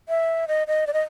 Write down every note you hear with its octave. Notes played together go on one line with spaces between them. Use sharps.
E5
D#5
D#5
D5
D#5